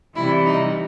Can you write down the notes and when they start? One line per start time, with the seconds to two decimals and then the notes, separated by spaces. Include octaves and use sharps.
0.15 C3 E3 G3 E4
0.46 D#4